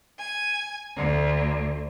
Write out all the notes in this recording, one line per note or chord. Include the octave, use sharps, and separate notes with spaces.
G#5
D2